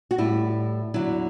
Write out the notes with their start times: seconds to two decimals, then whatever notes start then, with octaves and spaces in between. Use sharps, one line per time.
0.11 F#4
0.18 A2 G3 E4
0.94 E2 D3 F#3 E4